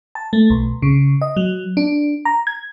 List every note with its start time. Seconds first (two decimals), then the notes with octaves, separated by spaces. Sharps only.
0.15 A5
0.33 A3
0.50 B1
0.82 C#3
1.21 D#5
1.36 F#3
1.77 D4
2.25 A#5
2.47 G#6